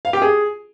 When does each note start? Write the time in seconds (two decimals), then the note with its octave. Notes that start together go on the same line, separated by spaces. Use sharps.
0.05 F5
0.13 G4
0.22 G#4